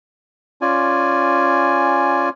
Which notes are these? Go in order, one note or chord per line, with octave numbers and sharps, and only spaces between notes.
C#4 F4 D5 G#5